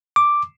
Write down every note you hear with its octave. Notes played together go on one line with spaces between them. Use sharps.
D6